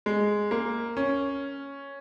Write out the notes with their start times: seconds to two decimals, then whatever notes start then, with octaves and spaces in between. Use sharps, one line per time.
0.06 G#3
0.51 A#3
0.97 C#4